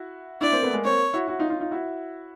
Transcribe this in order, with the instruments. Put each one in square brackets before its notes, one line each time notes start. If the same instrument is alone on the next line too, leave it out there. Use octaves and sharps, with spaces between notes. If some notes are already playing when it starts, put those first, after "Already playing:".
Already playing: [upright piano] E4 F#4
[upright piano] D4 E4 [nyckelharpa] D5
[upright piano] A#3 C4
A3 B3
G#3 A#3
[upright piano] A#3 C4 [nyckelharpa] C#5
[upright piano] E4 F#4
E4 F#4
D#4 F4
D#4 F4
D#4 F4
E4 F#4